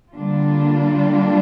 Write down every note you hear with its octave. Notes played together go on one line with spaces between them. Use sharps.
D3 G3 A#3 D4 F4